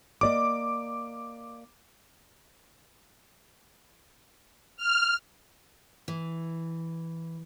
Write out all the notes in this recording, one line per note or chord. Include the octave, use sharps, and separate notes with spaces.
A#3 D5 D#5 D6
F6
E3